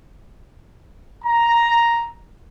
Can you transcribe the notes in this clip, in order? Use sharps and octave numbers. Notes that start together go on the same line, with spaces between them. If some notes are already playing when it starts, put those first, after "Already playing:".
A#5